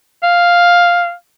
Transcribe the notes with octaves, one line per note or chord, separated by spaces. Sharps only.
F5